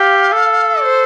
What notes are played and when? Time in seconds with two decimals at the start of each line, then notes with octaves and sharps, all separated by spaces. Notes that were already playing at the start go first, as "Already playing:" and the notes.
Already playing: G4 F5
0.32 A4
0.83 C5